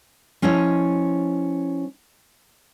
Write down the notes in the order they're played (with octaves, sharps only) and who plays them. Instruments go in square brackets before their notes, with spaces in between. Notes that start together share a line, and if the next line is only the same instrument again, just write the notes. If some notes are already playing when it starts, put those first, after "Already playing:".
[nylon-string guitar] F3 C#4 E4 C#5 D#5